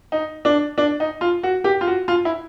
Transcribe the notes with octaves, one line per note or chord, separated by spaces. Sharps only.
D#4
D4
D4
D#4
F4
F#4
G4
F4
F#4
F4
E4